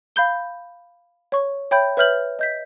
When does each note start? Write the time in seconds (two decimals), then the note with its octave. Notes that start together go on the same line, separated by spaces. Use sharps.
0.16 F5 B5 G6 G7
1.32 C#5 C#6
1.71 C#5 E5 G5 B5 G6
1.97 B4 C#5 E5 F6 G6 F#7
2.39 D#5 G6 B6